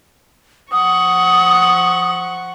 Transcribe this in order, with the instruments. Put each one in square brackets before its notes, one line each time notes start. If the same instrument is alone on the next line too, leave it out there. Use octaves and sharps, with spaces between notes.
[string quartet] F3 F#5 C#6 [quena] D#6